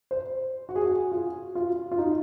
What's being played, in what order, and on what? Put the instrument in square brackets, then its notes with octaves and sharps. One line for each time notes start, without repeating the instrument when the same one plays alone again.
[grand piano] C5
F#4
G#4
F#4
F4
F4
F4
D#4